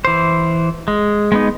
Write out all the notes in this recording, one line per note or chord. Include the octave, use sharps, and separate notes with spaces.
E3 C5
G#3
G#3 B3 D#4